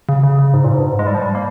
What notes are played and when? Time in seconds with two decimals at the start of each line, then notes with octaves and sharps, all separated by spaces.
0.09 C#3
0.23 C#3
0.39 C#3
0.54 G#2
0.64 A#2
0.69 G#2
0.78 G2
0.84 G#2
0.99 G#3
1.07 G3
1.14 F3
1.22 G3
1.35 A#3